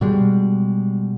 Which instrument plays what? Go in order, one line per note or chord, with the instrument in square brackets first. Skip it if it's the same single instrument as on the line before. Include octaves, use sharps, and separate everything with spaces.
[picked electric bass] B2 G3 G#3